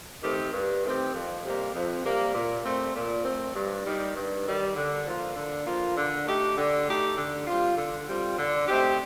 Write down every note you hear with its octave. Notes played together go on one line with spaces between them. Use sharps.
D#3 A3 C4 G4
G2
D#3 A3 C4 G4
F2
C3 G3 A#3
F2
C3 G3 A#3
A#2
A3 C4
A#2
A3 C4
G2
D#3 G3
G2
D#3 G3
D3
F3 A#3 F4
D3
F3 A#3 F4
D3
A3 D#4 G4
D3
A3 D#4 G4
D3
G3 C4 F4
D3
G3 C4 F4
D3
A3 C4 D#4 G4